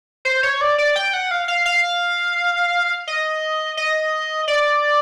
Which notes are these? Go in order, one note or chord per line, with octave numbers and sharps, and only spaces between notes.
C5
C#5
D5
D5
G5
F#5
F5
F5
F5
D#5
D#5
D5